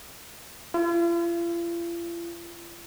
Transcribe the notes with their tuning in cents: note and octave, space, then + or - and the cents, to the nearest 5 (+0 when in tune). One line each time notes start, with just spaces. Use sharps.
F4 -45